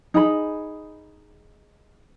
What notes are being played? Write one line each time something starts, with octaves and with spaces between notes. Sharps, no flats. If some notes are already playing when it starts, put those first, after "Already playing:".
D#4 G#4 B5